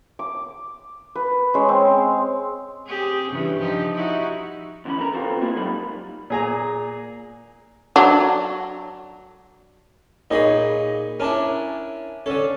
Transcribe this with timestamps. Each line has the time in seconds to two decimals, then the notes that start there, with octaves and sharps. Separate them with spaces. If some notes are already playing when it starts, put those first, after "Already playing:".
0.19 D6
1.16 B4
1.54 G#3 C#4
1.69 C4
2.87 C4 G4 G#4
3.30 G2 C#3 E3
3.60 F3 D#4 G4
3.94 D#4 E4 F#4
4.85 D2 E3 C#4 B5
5.00 A4 A#4 A#5 B5
5.13 B3 C4 F4 F#4 A4 A#4
5.41 A#3 C4 E4 F4
5.55 G#2 F#3 G3 D#4 A#4 B5
6.30 A#2 G#4 A#5
7.96 F#3 D4
10.30 A#2 D#4 G#4 C#5 D#5 B5
11.20 C#4 D4 E4 A#4 A5
12.26 D3 C#4 A4